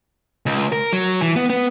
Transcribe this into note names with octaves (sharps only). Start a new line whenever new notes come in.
C#2
A#4
F#3
E3
B3
B3